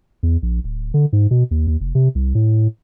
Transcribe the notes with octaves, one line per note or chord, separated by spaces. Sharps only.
E2
A#1
D1
D3
G#2
B2
D#2
D#2
F1
C3
C2
A2